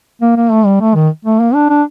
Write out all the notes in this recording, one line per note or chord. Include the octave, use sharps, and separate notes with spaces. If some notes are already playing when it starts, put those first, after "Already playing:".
A#3
A#3
A3
G3
A3
D#3
A3
A#3
D4
D4